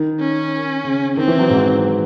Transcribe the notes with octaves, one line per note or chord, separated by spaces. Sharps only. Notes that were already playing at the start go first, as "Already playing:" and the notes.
Already playing: D#3
C#4
C#3
D#3 C4
E3
F#3
G#2